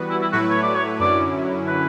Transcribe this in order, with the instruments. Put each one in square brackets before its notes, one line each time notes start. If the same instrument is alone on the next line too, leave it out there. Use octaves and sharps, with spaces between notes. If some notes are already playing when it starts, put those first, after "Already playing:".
Already playing: [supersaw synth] E3 G3 B3 F#4 B4
[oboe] E4
E4
[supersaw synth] A2 F#3 A3 E4 B4 [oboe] F#4
[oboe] C#5
D5
C#5
[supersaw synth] F#2 D3 F#3 C#4 E4 [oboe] D5
[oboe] B4